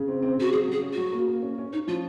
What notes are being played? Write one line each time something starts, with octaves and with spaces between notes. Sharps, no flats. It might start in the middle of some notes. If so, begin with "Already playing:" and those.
Already playing: C#3
C4
C4
C#3 F#4
F#3 G#4
F#3 G#4
C#4
F#3 F#4
A#3
A#3
C#4
C#4
C#4 D#4
F3 F4